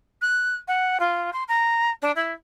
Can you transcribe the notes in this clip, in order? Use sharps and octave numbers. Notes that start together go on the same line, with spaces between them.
F#6
F#5
F4
C6
A#5
D4
E4